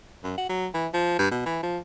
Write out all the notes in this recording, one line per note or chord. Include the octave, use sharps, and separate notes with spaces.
F#2
F#4
F#3
E3
F3
G2
B2
E3
F3